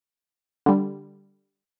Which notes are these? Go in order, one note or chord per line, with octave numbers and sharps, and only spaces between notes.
D3 G3